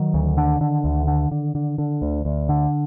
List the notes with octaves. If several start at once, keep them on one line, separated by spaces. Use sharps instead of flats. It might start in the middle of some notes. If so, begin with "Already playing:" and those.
Already playing: D#3 F#3
D2
D3
D3
D2
D3
D3
D3
D3
D2
D2
D3